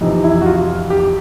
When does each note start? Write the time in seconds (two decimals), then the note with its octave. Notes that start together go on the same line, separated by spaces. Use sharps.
0.01 F2 C3 E3 D#4
0.24 E4
0.41 F#4
0.46 F4
0.90 G4